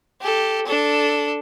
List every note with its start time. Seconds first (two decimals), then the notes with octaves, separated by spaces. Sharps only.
0.22 G4 A4
0.67 D4 A4